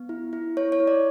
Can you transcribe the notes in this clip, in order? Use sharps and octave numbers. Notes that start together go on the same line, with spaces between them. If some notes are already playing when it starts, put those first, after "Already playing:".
Already playing: B3
E4
E4
E4 C#5
C#5
E4
D5